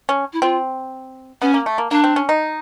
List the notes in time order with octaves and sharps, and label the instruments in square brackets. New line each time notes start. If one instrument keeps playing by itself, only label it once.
[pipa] C#4
[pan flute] E4
[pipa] C4 [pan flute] F4
[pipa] B3 [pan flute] C#4
[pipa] A#3
A3
A#3
[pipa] A#3 [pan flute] D4
[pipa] C4
C#4
D#4